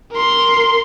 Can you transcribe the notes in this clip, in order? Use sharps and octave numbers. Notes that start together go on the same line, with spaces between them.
A#4 C6